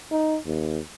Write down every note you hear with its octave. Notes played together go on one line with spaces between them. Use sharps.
D#4
D#2